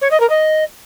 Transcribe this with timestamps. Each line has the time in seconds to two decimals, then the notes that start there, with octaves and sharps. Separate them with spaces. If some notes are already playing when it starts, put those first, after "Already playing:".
0.01 C#5
0.11 D#5
0.20 A#4
0.30 D#5